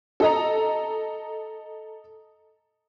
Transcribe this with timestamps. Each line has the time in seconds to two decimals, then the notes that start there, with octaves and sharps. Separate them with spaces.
0.20 A4 D#5 A#5